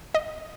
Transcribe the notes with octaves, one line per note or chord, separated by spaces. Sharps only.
D#5